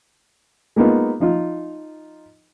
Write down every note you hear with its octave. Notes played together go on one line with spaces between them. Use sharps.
G#3 A#3 B3 D#4 F4
F3 D#4 F4